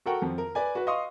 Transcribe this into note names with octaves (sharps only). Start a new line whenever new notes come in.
F#4 A4 A#4 F#5 G5 C#6
F2 F3
A#4
B4 D5 G#5
F#4 B4
D#5 F5 C6 C#6 D#6